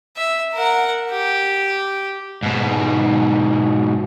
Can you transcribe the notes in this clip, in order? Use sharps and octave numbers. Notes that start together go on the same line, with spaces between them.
E5
A#4 F#5
G4
G#2 B2